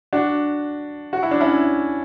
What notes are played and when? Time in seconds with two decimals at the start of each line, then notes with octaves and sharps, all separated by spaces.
0.13 D4 F#4
1.13 F#4
1.23 E4
1.31 D4
1.41 C#4 E4